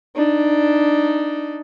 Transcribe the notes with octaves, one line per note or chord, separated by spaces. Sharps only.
D4 D#4